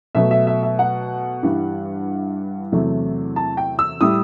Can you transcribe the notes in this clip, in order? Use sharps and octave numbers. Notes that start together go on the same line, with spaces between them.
B2 F#3 A3 E5
E5
E5
E5
F#5
G2 E3 G3
E2 C3 F#3 A3
A5
G5
E6
A2 G3 D#6